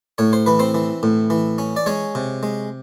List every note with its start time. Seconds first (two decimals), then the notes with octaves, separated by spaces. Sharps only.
0.18 A2 C#5
0.33 C5
0.46 E3 B4
0.59 C4 C5
0.74 E3
1.03 A2
1.30 E3
1.58 C#4
1.76 D5
1.86 G#3 C#4 C#5
2.15 C3
2.43 G#3